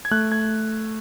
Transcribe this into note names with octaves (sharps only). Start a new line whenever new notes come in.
G#6
A3 F#6
G#6